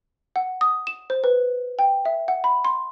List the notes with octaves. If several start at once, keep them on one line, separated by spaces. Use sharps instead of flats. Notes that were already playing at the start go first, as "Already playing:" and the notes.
F#5
D#6
E7
C5
B4
G5
E5
F#5
B5
C6